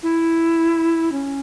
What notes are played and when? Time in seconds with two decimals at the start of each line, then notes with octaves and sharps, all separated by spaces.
0.03 E4
1.12 C#4